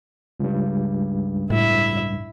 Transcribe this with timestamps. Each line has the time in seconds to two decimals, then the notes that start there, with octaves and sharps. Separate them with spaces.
0.40 C#2 G2
1.50 A2 E4 E5